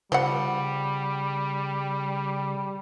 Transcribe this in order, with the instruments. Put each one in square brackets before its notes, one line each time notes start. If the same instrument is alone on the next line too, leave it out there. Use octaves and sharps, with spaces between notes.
[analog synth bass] C#3 [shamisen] F3 F#5 [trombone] G3